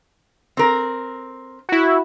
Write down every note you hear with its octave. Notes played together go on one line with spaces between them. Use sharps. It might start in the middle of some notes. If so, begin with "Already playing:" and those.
C4 A#4
E4 F#4